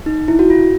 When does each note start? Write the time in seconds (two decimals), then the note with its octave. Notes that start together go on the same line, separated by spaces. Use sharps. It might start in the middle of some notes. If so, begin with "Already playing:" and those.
0.06 D#4
0.28 E4
0.39 F#4
0.50 F4